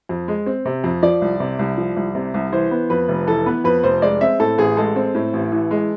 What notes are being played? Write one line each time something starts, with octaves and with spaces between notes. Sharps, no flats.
F2
G#3
C4
C3
F2
F3 D5
C2
C3
C2
F3
C2
C3
C2
E3 C5
B3
F2 B4
F1
E3 A4
B3 B4
F2 B4
F1 C5
G#3 D5
C4 E5
A2 A4
A1 G#4
G#3 A4
C4
A2
A1
E3
G#3